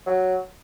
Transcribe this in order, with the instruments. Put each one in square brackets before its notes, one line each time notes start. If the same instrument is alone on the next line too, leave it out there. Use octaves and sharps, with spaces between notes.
[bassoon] F#3